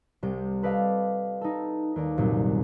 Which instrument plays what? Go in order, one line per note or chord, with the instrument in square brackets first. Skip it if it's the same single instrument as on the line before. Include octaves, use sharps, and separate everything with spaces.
[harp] C2 C3 G5
A4 B4 D5 D#5 F5
D#4 A4
D#2 D5
C2 F#2 A#2